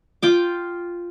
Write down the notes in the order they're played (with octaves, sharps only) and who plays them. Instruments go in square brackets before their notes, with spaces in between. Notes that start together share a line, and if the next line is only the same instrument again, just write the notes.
[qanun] F4 G5 D6